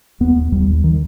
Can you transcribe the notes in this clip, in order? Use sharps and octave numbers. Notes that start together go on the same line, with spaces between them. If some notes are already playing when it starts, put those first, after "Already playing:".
D#2 B3
D#2 G3
D#3